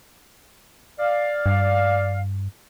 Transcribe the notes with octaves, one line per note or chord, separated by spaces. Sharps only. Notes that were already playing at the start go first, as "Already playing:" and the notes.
D5 F5
G2